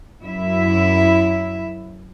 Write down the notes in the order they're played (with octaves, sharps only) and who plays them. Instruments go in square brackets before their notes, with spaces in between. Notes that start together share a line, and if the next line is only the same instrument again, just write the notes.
[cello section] F#2 E4 E5